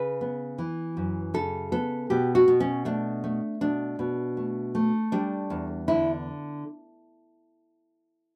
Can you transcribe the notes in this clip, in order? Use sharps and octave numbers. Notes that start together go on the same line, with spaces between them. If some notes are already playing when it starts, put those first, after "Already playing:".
Already playing: C#3 B4
B3
E3
F#2
C#3 A4
B3 A4
B2 G4
F#4
B2
C#4
A3 D4
A3
B2 D4
B2
A3
A3
G3 D4
E2
D3 E4